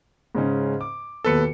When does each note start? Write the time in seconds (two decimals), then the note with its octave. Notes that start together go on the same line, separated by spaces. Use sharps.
0.35 G#2 C#3 C#4
0.81 D6
1.24 D#2 B2 A4 B4 C#7